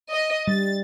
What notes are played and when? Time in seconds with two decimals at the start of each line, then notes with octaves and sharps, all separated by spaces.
0.11 D#5
0.48 G3 A6